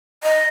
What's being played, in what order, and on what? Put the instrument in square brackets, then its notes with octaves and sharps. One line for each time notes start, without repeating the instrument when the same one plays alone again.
[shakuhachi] D#5